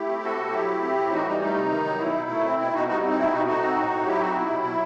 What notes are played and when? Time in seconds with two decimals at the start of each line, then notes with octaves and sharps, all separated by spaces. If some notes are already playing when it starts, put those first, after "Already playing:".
Already playing: A3 E4 G4
0.09 C4
0.23 C4 F#4 A4
0.38 B2
0.53 F#3 E4 G4
0.67 A3
0.82 C4
0.97 A2
1.11 E3 D#4 F#4
1.26 G3 D#4
1.41 A3 D#4
1.56 C3
1.71 D#3
1.85 F#3
2.00 B2 E4
2.15 B2
2.29 A3
2.44 C4
2.59 B2 E4
2.73 B2 D#4 F#4
2.88 G3 D#4 F#4
3.03 C4 D#4
3.18 B2 E4
3.32 B2 D#4 F#4
3.47 A3 D#4 F#4
3.62 C4
3.76 A2
3.91 A2
4.06 F#3 E4 G4
4.21 C4 D#4 F#4
4.35 B2 E4
4.50 B2
4.65 F#3